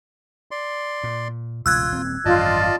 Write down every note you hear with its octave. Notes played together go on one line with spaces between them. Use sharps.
D5 C6
A#2
E1 C#2 A#2 F4 E6 F#6 G#6
D#1 C4
G#1 F#2 D3 F4 D5 D#5 A5